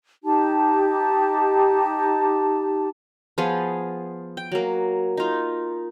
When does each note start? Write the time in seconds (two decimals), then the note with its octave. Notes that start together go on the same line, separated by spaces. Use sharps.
0.24 D#4 G4 A5
3.38 F3 B3 F4 G#4
4.37 G5
4.52 F#3 A#3
5.17 D#4 F4